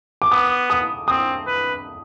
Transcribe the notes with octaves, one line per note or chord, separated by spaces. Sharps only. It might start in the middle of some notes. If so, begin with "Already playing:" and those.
D6
B3 D#6
D#6
C4 D#6
B4